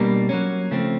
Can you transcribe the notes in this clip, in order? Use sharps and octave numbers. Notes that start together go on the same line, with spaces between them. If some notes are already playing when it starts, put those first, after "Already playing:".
Already playing: B2 G3 A#3 D4
F#3 A#3 C#4
C#3 F3 A3 C4